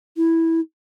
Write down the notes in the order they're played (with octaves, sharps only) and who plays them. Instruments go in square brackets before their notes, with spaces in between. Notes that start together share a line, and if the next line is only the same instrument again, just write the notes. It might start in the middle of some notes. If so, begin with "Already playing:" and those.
[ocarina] E4